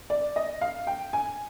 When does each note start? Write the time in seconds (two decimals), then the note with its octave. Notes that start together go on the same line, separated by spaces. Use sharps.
0.10 D5
0.36 D#5
0.61 F5
0.87 G5
1.13 G#5